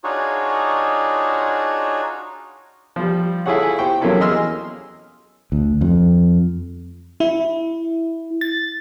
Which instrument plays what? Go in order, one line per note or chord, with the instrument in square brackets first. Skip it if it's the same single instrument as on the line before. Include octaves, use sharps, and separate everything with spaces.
[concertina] D4 D#4 F4 F#4 G#4 C#5
[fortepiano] F3 G3
E4 F4 G#4 A4 C#5 F#5
G4 C5 G5 C#6
C3 F#3 A#3 C#4 E4 A4
E2 G#4 D#5 C6 E6 F6
[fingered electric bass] D2
F2
[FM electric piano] E4
A6